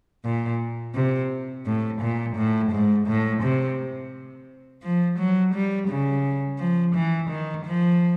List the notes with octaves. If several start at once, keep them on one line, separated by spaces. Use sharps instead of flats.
A#2
C3
A2
A#2
A2
G#2
A2
C3
F3
F#3
G3
C#3
F3
E3
D#3
F3